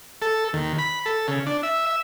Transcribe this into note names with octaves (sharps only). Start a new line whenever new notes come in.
A4
D#2
B5
A4
C#3
D4
E5
E5